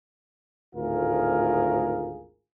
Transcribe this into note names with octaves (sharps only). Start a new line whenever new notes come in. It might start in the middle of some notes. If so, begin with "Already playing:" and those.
G#1 D2 A2 F4 G#4 A#4